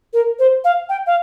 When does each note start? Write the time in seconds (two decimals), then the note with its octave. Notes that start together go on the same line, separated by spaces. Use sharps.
0.13 A#4
0.39 C5
0.64 F5
0.89 G5
1.06 F5